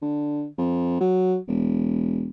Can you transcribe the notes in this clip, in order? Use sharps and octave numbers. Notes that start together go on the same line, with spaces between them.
D3
F2
F#3
E1